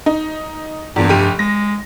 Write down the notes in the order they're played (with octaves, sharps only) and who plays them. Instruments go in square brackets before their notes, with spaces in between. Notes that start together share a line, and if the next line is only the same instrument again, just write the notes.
[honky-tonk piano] D#4
[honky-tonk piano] E2 A#2 [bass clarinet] G2
[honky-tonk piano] F1 G4 D#7
[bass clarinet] G#3 [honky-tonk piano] A#6